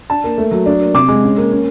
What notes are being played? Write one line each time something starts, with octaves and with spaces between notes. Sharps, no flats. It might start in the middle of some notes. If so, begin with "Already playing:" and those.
D4 A5
A#3
A3
F#3
D4
A#3
C3 D6
G#3
C#4
A#3
C#4